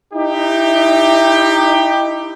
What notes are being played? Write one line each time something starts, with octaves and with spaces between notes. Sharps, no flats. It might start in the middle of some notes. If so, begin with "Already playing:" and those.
D#4 E4 G4